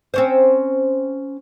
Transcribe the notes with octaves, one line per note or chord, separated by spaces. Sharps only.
C4 C#4 C5